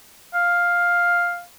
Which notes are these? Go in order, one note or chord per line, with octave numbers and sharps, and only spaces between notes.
F5